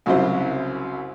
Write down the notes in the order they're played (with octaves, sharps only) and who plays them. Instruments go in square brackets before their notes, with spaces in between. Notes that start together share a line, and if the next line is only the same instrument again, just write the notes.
[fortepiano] C2 F#2 C#3 F#3 E4 C5